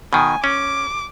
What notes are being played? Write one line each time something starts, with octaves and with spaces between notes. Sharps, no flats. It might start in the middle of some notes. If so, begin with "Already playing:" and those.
B2 D#3 G#5
C#4 D6